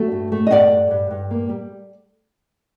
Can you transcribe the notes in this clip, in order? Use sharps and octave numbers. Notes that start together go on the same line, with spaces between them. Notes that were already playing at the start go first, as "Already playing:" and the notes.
Already playing: A3 F#4 A4
G2
A3
D#5
G2 D5 F#5
G2
G2
G2
A#3
G3